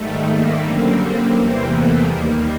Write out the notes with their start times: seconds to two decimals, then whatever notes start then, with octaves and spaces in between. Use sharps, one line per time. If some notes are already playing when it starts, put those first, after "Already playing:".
Already playing: G#2 D#3 G3 A3
0.28 A#3
0.63 F#2 D3 G3 A#3 C4
1.34 E2 C3 E3 G3
1.69 A3 B3
2.05 D#2 D#3 G3 A#3